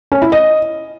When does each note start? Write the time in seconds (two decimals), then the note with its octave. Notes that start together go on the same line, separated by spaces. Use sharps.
0.12 C#4
0.22 E4
0.32 D#5